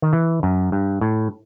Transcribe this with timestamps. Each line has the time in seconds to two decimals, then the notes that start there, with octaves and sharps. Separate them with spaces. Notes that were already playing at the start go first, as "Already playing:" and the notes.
0.02 D#3
0.13 E3
0.43 F#2
0.72 G2
1.01 A2